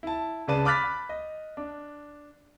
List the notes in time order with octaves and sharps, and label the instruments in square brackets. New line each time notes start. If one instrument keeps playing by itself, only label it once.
[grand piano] E4 A5
C#2 C#3 B4 D5 A5 D#7
B5 D6 F6 F#6 A6 B6
D#5
D4